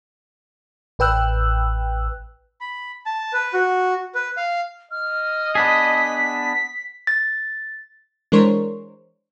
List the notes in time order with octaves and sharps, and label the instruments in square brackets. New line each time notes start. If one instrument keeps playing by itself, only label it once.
[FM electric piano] A1 B4 G5 E6 F#6
[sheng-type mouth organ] B5
A5
B4
F#4
B4
F5
[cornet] D#5 [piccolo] F6
[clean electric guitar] B3 D4 G#4 [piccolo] B6
[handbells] A6
[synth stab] E3 G#3 D4 A#4 C5 C#5